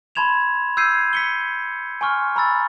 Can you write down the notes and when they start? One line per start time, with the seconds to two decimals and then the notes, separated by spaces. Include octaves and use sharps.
0.15 A5 B5 C6 G#6 E7 F7
0.77 E6 G6 G#6 C7 D#7
1.13 B6 C#7 G7
2.01 G#5 C6 C#6 F6
2.36 A#5 B5 E6 A6